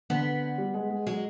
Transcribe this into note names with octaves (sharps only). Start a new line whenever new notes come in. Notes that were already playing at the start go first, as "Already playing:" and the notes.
D3 B3
G3
G#3
G#3
F#3 G#3